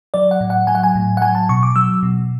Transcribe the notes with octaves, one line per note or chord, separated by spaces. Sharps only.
F#3 D5
F#5
A2
F#5
F#3 G#5
F#5
G#5
A2
F#5
F#3 G#5
A5
B2 C#6
D6
F#3 E6
B2